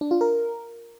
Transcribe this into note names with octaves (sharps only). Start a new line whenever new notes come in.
D4
F4
A#4